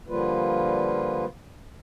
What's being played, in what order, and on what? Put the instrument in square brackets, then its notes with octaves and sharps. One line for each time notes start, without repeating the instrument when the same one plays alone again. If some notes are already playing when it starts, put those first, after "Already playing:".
[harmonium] D3 F3 G3 A#3 F4 B4